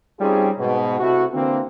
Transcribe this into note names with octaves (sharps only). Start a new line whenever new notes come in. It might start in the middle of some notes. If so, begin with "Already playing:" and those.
G3 C4 C#4 D#4 F4 G#4
G#2 B2
C3 A3 E4 F#4
D3 E3 A#3 C4